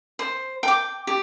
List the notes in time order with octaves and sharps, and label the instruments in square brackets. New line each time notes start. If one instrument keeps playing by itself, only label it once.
[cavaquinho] C5
G5 D6
G4